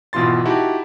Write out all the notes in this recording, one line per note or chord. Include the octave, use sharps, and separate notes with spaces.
G#1 B2 E3 F4 C6 A6
D#4 E4 F#4 G4 A5